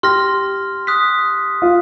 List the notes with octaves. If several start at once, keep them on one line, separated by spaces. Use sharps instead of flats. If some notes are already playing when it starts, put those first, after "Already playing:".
G4 C6 F6 A#6
D#6 F#6 B6
F4